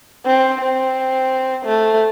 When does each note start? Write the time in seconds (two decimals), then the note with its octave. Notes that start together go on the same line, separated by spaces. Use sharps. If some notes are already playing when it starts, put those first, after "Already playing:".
0.26 C4
0.61 C4
1.66 A3